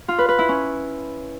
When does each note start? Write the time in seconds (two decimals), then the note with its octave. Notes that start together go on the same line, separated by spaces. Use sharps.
0.08 F4
0.18 B4
0.29 B4
0.39 E4
0.49 C#4